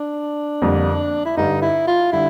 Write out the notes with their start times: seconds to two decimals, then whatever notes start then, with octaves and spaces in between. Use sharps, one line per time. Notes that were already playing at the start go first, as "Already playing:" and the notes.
Already playing: D4
0.62 F2 D3 G3 A#3
1.26 E4
1.37 G2 D3 G3 D#4
1.62 E4
1.88 F4
2.13 D3 G3 E4